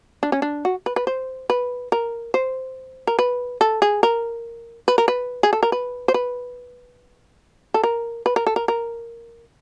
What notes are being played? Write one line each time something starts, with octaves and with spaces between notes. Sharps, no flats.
D4
C#4
D4
F#4
B4
B4
C5
B4
A#4
C5
A#4
B4
A4
G#4
A#4
B4
A#4
B4
G#4
A4
A#4
B4
C5
B4
A4
A#4
B4
A#4
A4
A#4
A#4